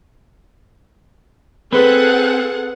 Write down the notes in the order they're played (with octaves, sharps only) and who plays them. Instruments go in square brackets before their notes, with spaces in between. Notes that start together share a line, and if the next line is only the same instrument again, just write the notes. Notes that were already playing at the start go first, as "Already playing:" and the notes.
[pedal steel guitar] C4 [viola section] G#4 A4 F#5 [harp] B4 C5